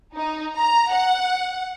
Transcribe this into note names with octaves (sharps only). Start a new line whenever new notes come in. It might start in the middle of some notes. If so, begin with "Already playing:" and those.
D#4
A#5
F#5